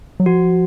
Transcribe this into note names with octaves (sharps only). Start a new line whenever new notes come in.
F#3
F3 F#4